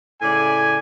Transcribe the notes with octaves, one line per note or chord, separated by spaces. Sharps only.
A2 C#3 D5 G#5